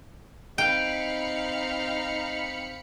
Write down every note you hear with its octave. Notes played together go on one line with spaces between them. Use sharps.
C4 D#4 F5 G5 B5 C#7